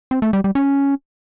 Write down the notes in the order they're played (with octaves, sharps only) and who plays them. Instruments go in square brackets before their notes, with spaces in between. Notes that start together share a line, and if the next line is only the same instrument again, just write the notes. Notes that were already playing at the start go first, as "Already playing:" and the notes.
[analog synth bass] C4
A3
G3
G3
C#4